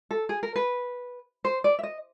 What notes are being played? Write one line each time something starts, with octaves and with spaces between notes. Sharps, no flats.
A4
G#4
A#4
B4
C5
D5
E5
D#5